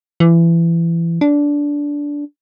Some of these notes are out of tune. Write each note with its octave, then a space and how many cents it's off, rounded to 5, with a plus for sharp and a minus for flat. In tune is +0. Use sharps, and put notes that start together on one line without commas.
E3 +25
D4 -15